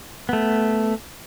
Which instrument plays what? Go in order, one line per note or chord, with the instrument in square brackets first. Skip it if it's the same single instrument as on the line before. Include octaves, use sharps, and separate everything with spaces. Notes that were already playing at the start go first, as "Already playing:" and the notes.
[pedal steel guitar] A3 B3